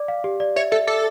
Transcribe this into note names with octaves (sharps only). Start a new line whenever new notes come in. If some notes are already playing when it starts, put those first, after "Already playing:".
Already playing: D5 D6
F5
G4
D5
C#5 E5
A4 E5
A4 D6